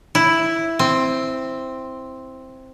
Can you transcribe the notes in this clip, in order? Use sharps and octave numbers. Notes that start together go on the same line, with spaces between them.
E4
C4